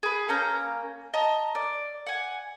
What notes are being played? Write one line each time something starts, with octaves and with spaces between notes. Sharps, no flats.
G#4 B4
A#3 C#4 A#5 G6
D#5 A5 A#5
D5
F#5 G#5